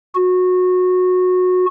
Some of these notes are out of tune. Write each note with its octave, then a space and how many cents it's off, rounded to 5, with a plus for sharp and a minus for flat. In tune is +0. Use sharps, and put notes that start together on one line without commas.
F#4 -20